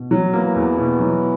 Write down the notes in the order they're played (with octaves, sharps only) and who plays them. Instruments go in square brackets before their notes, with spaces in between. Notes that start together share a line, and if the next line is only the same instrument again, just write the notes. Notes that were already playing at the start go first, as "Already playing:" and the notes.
Already playing: [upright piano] B2
F#3
[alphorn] E3 [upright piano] A#3
[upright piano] E2
B2
F#3